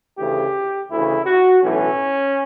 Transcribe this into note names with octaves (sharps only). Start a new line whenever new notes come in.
D2 C#3 E3 G4
D2 C#3 E3 E4
F#4
B1 A2 E3 C#4